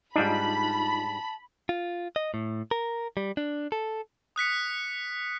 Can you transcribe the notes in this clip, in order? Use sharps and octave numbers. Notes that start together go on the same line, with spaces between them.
G#2 G3 D4 D#4 F4 A5 B5
F4
D#5
A2
A#4
G3
D4
A4
D#6 F#6 B6 C#7